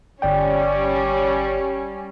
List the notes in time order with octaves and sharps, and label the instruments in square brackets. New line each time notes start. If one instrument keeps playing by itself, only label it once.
[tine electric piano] G1 D5 G5 [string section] G3 C#4